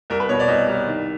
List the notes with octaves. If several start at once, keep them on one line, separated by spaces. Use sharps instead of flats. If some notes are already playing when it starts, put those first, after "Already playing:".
C2 A#4
B4
B2 C#5
D5
C2 D#5
C2
D#3